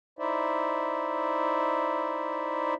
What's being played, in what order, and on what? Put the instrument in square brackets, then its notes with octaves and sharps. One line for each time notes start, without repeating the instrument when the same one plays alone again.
[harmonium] D#4 E4 C5 D5 E5